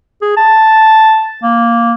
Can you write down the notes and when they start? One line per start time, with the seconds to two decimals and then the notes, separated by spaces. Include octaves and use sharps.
0.22 G#4
0.37 A5
1.43 A#3